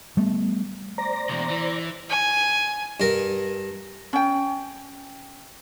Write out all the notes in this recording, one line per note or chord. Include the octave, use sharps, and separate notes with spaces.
G3 A3 B3
C5 D5 A#5 A#6
E2 B2
E3
G#5
G2 A#4
C#4 G5